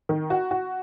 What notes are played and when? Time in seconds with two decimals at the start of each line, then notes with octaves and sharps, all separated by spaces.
0.09 D#3
0.30 F#4
0.51 F#4